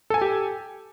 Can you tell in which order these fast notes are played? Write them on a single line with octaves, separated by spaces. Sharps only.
A4 G#5 A5 G4